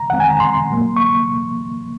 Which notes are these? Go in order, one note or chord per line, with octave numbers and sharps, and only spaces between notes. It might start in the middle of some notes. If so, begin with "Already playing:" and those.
Already playing: A#5
F2 D#3 G#3 C4 F#5
G#5
A#5
C6
A#2 F#3 A#3
C#6